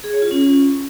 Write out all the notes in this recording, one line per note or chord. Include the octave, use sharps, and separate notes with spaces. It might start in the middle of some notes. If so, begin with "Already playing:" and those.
G#4
C#5
F4
C#4